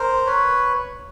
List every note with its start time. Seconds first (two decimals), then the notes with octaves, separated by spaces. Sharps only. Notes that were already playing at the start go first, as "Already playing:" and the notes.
Already playing: A#4 C5
0.26 B4 C#5